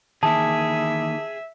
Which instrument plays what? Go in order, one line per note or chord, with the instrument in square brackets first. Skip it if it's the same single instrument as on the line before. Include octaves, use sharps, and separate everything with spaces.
[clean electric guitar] D#3 E3 A#3 [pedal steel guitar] G#4 [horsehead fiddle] E5 [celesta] A5